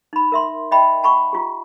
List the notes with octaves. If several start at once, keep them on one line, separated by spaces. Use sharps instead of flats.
D#4 B5
A#4 E5 C6
D#5 E5 G5 B5
F#5 A5 B5 C#6
F4 G4